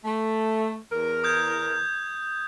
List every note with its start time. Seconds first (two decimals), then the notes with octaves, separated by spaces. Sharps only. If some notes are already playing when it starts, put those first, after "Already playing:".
0.05 A3
0.91 E2 A#4
1.24 D#6 G6 G#6